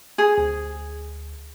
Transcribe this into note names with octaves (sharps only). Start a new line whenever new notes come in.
G#4
D2